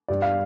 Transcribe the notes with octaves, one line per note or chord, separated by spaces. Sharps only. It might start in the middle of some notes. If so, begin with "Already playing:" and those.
G2 G3 D5
F5